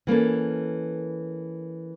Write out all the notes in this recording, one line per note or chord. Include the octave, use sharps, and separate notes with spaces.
E3 A#3 C#4 A4